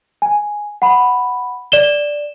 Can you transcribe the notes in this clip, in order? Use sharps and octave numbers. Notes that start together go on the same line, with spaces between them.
G#5
F#5 B5
D5 E7 G7